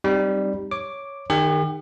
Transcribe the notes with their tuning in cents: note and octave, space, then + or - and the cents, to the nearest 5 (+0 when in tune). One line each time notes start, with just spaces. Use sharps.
G3 +0 C4 +0 D#4 -20
C#5 +0 D6 +0
D#3 -20 G4 +40